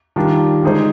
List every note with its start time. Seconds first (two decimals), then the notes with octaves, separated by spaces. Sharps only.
0.16 D#3 G3 D4 F4
0.63 D3 G#3 D#4 G#4 C5